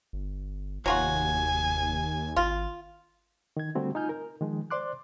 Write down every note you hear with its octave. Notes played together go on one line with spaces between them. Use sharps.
G1
F1 D#2 F#3 F4 F#4 G#5
G#1 F4
D#3 G#6
D3 G3 A3 C4 F#4
D#4 F4 G#5 F6 G6
A#4
D#3 F3 G#3
C5 D5 C6 D6 F#6